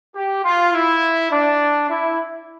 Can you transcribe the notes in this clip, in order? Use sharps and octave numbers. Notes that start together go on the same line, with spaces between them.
G4
F4
E4
D4
E4